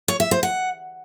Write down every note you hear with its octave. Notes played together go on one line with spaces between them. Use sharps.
C#5
E5
C5
F#5